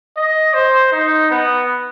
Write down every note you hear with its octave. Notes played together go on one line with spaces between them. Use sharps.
D#5
C5
D#4
B3